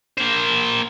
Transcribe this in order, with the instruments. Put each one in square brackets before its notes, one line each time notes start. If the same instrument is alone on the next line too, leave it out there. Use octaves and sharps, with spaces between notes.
[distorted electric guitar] A#3 C5